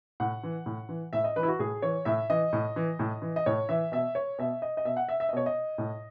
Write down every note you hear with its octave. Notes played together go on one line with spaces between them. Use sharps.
A2 F#5
E3
A2
E3
A2 E5
D#5
E3 B4
E4
F#4
A2 G#4
E3 C#5
A2 E5
E3 D#5
A2
E3
A2
E3
D#5
A2 C#5
E3 E5
B2 E5
C#5
B2 E5
D#5
D#5
B2 E5
F#5
E5
E5
D#5
B2 C#5
D#5
A2